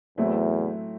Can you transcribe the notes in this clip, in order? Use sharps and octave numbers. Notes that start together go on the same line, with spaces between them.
E2 A2 F#3 A3 C4 E4